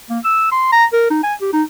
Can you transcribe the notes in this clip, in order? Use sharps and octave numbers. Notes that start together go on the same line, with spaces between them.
A#3
E6
C6
A#5
A#4
D#4
G#5
G4
D#4